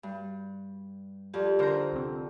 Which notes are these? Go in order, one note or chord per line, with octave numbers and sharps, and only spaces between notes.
G2
F2 G4 D5
D3 D4 A#4 C5 A#5
C2 C4